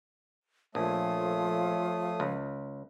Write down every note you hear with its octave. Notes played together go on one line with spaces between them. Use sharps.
A#1 F3 A3 A4 C#5 F5 D#6
C#2